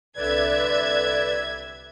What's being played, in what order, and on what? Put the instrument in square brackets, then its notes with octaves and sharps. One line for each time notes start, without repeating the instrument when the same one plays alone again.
[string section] C2 E5 G#6 [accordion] D3 B4 D5